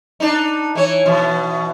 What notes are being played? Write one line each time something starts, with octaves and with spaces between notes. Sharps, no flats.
D4 D#4
E3 C#5
B2 E3